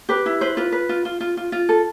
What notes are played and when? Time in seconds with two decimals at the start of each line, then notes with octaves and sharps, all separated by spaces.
0.09 G4 B4
0.26 E4
0.41 B4 C5
0.57 F4 B4
0.72 B4
0.89 F4
1.05 F4
1.20 F4
1.37 F4
1.52 F4
1.69 A4